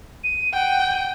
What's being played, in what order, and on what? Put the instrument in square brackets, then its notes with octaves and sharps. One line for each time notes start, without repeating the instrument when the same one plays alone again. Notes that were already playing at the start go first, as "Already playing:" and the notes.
[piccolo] D#7
[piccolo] F#5 [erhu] G5